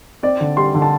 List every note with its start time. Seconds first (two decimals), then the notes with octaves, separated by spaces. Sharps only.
0.23 C4 D5
0.40 D3
0.57 G3 C6
0.74 D3
0.82 A5